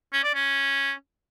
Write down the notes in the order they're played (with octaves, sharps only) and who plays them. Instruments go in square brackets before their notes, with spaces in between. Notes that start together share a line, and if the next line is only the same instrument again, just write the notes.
[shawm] C#4
D5
C#4